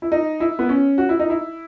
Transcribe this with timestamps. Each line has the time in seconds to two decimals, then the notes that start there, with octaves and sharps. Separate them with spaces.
0.02 E4
0.12 D#4
0.40 E4
0.59 B3
0.69 C#4
0.98 F#4
1.09 E4
1.19 D#4
1.30 E4